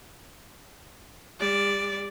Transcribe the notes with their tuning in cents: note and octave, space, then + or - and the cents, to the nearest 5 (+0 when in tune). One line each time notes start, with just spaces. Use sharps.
G3 +35 D5 +0